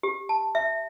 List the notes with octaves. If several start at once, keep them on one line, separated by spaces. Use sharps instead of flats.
G4
A5
E5